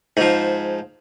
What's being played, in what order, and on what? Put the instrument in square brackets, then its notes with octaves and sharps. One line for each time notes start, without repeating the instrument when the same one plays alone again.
[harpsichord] G#2 F3